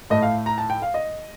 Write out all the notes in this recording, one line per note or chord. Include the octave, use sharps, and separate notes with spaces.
A2 A3 D#5
F5
A#5
A5
G5
F5
D#5